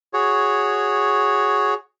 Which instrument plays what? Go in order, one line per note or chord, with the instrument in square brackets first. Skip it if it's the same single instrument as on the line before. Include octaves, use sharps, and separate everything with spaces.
[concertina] F#4 G#4 C#5